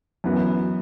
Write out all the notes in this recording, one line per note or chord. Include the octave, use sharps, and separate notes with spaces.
F#2 E3 B3 F#4